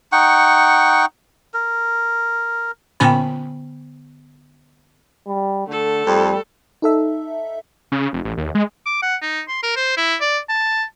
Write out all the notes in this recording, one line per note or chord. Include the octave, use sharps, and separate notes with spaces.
D#4 F#5 G5 C#6
A#4
A#2 D3 B3 C#4 G5 B5
G3
D3 A3 A4
F2 G3
D#4 A4 E5
C#3
F1
A1
D#2
G#3
D6
F#5
D#4
C6
A#4
C5
E4
D5
A5